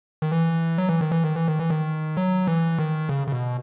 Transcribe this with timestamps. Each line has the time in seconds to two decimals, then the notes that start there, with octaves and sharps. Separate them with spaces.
0.22 D#3
0.32 E3
0.78 F#3
0.89 E3
1.01 D#3
1.12 E3
1.24 D#3
1.36 E3
1.48 D#3
1.59 E3
1.70 D#3
2.17 F#3
2.47 E3
2.78 D#3
3.09 C#3
3.27 C#3
3.32 B2